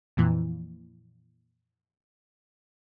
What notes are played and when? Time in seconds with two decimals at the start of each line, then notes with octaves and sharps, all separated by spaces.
0.17 F2 A#2 E3